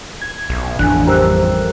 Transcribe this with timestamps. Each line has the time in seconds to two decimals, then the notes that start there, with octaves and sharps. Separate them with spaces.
0.22 G#6
0.50 B1
0.79 A1 F2 E3 D4 G#5 F#6
1.07 G3 G4 A#4 C5 E6 F#6